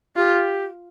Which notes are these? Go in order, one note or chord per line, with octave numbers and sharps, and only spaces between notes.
F4 G4